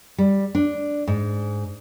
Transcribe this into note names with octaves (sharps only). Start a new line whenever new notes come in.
G3
D4
G#2